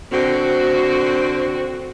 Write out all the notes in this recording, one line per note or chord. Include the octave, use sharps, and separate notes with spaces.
D3 C4 F#4